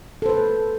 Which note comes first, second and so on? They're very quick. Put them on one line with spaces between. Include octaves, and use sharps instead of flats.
A4 C5 B4